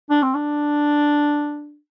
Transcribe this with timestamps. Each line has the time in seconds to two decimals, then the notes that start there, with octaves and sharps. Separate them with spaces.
0.10 D4
0.23 C4
0.35 D4